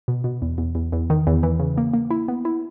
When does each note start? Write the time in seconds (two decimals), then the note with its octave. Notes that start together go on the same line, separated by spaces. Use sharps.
0.08 B2
0.24 B2
0.42 E2
0.58 E2
0.75 E2
0.92 E2
1.10 D#3
1.27 E2
1.43 E3
1.60 C#3
1.78 A#3
1.94 A#3
2.10 E4
2.28 B3
2.45 E4